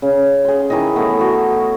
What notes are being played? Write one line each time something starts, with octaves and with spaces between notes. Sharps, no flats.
C#3
G#4 C6
D#3 E3 G#4 D#5
A3 B3 C#5
F#4 C#5